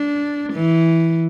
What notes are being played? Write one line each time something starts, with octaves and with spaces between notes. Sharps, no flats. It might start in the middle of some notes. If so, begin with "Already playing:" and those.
Already playing: D4
E3